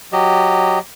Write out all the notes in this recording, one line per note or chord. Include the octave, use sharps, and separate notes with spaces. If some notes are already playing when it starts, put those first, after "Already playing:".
F#3 G4 D#5